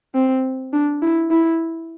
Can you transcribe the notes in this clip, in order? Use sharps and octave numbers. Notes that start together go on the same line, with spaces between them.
C4
D4
E4
E4